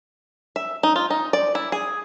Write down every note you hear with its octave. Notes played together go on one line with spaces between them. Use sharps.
E5
D#4
F4
D#4
D5
E4
G#4